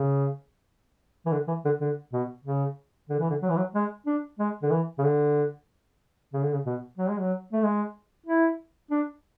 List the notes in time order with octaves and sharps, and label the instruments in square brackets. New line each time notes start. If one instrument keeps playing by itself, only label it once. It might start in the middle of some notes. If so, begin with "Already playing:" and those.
Already playing: [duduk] C#3
E3
D3
E3
D3
D3
B2
C#3
D3
E3
D3
F#3
E3
F#3
G#3
D4
G#3
D3
E3
C#3
D3
C#3
D3
C#3
B2
F#3
G#3
F#3
A3
G#3
E4
D4